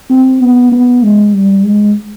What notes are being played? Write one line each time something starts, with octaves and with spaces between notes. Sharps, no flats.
C4
B3
B3
G#3
G3
G#3